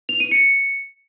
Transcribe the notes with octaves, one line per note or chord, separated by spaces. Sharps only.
F7
D#7
C#7